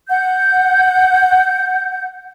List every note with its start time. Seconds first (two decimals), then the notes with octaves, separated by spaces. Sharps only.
0.09 F#5 G6